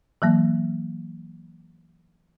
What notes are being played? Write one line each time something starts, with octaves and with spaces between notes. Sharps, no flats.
E3 F#3 A#3